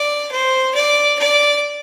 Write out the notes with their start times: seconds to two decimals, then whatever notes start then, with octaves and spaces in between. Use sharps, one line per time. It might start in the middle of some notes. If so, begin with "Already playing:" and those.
Already playing: D5
0.31 C5
0.75 D5
1.19 D5